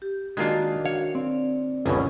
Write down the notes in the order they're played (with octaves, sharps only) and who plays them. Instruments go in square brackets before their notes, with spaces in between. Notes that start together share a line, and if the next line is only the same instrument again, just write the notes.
[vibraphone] G4
[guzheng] D#3 A#3 D4 [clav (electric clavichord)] G#3 F4 [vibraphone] F#4
[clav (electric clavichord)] C#5 [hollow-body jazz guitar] F5
[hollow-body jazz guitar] C4 [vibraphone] D5
[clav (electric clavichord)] G1 C#2 B2 [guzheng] F#2 C#4 C#5